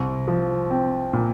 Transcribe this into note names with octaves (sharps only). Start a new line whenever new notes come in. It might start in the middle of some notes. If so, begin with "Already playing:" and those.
Already playing: C2
F3
C4
A#2